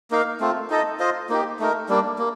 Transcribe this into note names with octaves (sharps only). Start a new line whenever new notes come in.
A#3 D#4 A#4 F5
A3 C4 F4
D#4 A4 D#5
F4 C5 D#5
A#3 D#4 G4
A3 D#4 A#4
G3 A#3 D4
A#3